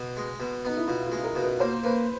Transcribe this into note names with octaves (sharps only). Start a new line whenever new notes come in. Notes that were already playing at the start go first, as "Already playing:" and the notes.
Already playing: B2
G#3
B2
B3 D#4
E4
B2 F4
F4
G#3
A#4
B2
B4
A#3 C5
A#3 B4